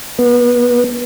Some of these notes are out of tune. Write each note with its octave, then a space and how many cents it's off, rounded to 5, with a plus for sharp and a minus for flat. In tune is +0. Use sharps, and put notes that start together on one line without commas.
B3 -25